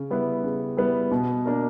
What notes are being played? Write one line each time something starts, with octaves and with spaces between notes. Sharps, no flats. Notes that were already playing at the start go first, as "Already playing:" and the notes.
Already playing: C#3
G3 B3 E4 B4
C#3
G3 B3 E4 B4
B2
A#3 D4 A#4